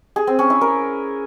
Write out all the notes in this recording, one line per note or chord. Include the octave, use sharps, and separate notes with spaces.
G#4
C4
C#4
E4
A#4